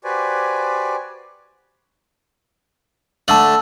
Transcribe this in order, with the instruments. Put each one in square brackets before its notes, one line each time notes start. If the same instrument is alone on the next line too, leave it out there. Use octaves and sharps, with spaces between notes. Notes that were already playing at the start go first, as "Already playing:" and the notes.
[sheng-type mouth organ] F#4 G4 B4 C5 D5 G#5
[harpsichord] D3 A3 [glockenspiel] A5 E6 F#7